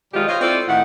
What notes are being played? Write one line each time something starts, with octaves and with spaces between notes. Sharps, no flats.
B2 D#3 G3 G#3 F4 G4
F4 C5 C#5 D#5
C4 E4 F4 A4 C5 D5
A2 D#3 E4 F#5